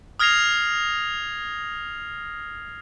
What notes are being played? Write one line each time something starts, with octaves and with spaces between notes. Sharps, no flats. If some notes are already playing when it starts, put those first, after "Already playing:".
D#6 F6 G#6 A#6 C7 F7